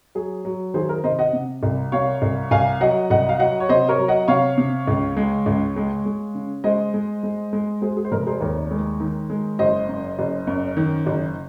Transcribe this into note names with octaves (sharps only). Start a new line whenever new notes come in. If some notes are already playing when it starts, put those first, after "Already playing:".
F#3 G#4
F#3
D#3 G#4 C5
A#4
C3 C5 D#5
D#5 F#5
C3
C2
C3 C#5 F5
C2
C2 F5 G#5
F#3 D#5 F#5
C2 D#5 F#5
F5
F#3 D#5 F#5
C#5
C3 C5 D#5
A#4 C#5
F#3
D#5 F#5
C3 C#5 F5
C3
C#2
G#3
C#2
G#3
G#3
C#3
G#3 C5 D#5
G#3
G#3
G#3
G#3 G#4 C5
G#4
C5
F1 A#4
G#4 C5
D#2 A#4 C#5
G#3
D#3
G#3
F#1 C5 D#5
F#2
F#1
F#2
D#3
F#1